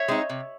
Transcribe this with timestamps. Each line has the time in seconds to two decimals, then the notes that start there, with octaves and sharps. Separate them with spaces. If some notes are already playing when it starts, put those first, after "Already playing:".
Already playing: C#5 E5
0.08 G#3 C4 D#4
0.29 C3